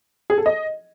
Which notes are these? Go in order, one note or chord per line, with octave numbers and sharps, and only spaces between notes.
G#4
A4
D#5